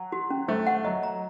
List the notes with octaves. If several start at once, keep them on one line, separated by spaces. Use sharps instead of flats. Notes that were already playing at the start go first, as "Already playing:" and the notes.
Already playing: F#3
F#4
C#4
A3 C5
F#5
F#3 D#5
A#5